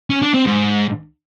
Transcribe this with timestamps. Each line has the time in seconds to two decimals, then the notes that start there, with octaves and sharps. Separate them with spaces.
0.10 C#4
0.22 D4
0.34 C4
0.46 G#2